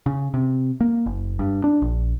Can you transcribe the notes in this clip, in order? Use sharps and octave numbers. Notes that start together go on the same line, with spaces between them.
C#3
C3
A#3
F#1
G2
D4
A#1